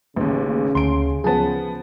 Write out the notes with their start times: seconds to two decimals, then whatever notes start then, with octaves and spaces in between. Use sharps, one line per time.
0.16 A1 D#2 C#3 C#4
0.75 D2 C6 D7
1.24 F3 B3 G#4 A5